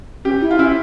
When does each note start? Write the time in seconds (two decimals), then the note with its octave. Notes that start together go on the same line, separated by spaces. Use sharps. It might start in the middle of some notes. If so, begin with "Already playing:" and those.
0.25 C#4 G4
0.41 E4
0.51 F4
0.58 C#4 E4